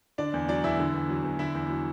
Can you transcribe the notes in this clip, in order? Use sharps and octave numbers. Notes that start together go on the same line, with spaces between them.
D3 D4 D5
E2
F#3 D4 D5
E2 E4 E5
D3
E2
F#3
E2
D3 E4 E5
E2
F#3